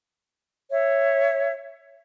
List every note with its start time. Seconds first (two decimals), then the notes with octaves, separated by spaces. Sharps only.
0.71 C#5 E5